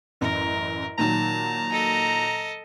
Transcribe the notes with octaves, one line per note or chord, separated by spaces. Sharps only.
A1 F#2 A#4
A#2 D#3 F#3 A5 A#5
A4 D#5